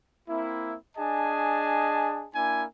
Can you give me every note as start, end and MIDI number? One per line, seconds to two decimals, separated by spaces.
0.28 0.76 58
0.28 0.76 60
0.28 0.76 64
0.98 2.27 62
0.98 2.27 68
0.98 2.27 75
0.98 2.27 80
0.98 2.27 81
2.34 2.64 58
2.34 2.64 62
2.34 2.64 64
2.34 2.64 80